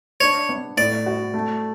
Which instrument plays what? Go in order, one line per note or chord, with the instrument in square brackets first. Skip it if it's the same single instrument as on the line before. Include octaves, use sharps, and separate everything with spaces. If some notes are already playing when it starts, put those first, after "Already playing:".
[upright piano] D4 [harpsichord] C#5
[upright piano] B3
[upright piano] A2 [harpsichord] D5
[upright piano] F#4
A3